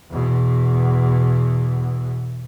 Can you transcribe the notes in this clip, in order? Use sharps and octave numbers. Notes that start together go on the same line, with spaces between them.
E2 B2